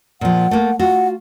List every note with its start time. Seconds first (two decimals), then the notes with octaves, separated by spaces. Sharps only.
0.21 A#2 F3 F#5
0.51 A3 A#3
0.79 F4 F#4 F#5